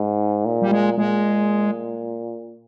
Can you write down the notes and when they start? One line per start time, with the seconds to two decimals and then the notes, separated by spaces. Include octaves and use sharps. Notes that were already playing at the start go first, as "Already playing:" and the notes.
Already playing: G#2
0.45 A#2
0.62 G3
0.71 G#3
0.98 A#2 G#3